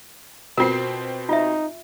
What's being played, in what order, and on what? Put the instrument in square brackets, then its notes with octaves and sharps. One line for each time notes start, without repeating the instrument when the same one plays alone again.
[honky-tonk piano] B2 C4 C7 [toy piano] F4 A#4
[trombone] D#4 [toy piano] F4 E5